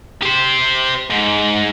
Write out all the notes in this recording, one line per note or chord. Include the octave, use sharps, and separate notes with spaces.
G4 C5
G#2